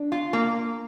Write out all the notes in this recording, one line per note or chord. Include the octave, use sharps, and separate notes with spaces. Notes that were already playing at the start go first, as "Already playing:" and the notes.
Already playing: D4
F4
A#3